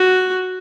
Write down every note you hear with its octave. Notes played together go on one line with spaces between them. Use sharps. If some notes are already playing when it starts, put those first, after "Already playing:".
Already playing: F#4